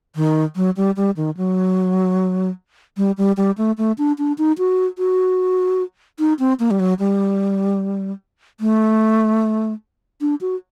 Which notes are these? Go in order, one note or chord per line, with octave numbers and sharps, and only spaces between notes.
D#3
F#3
G3
G3
D#3
F#3
G3
G3
G3
A3
A3
D4
D4
D#4
F#4
F#4
D#4
C4
A#3
G3
F#3
G3
A3
D4
F#4